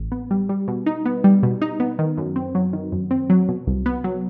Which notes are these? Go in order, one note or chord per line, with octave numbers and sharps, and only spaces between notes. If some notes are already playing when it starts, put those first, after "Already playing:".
Already playing: A1
B3
G3
G3
B2
D#4
B3
G3
B2
D#4
B3
D#3
F#2
C4
F#3
D#3
F#2
C4
F#3
B2
C2
B3
F#3